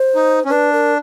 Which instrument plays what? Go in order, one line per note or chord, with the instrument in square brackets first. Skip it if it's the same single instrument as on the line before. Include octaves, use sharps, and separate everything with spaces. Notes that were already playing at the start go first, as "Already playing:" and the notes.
Already playing: [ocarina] C5
[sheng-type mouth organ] D#4
C#4
[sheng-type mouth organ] D4 [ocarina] B4
[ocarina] A#4